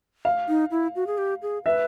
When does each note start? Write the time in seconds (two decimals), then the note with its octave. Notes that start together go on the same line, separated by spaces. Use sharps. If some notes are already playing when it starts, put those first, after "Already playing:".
0.25 F5
0.48 D#4
0.71 E4
0.96 F#4
1.07 G#4
1.18 G4
1.42 G#4
1.65 B4 E5